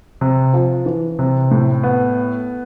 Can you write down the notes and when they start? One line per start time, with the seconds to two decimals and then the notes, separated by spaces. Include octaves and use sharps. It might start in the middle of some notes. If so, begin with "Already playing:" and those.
0.21 C3
0.53 F3
0.86 E3
1.19 C3
1.51 A2
1.83 B3